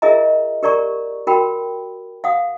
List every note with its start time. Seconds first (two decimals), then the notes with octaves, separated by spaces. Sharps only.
0.02 F4 G#4 A#4 D#5 E5 A#5
0.63 G4 A#4 D5 A#5 C#6
1.27 F#4 A#4 G5 B5
2.24 F5 F#5 D#6